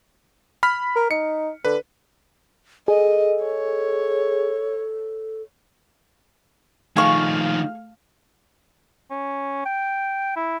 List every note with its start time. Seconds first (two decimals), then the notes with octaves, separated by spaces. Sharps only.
0.63 B5 F6 B6
0.96 A#4
1.11 D#4 C#7
1.65 D3 B4
2.88 G#4 A4 D#5
3.44 C#5
6.97 D#3 F3 A3 G#4 F5 C#6 F6
9.11 C#4
9.65 G5
10.36 E4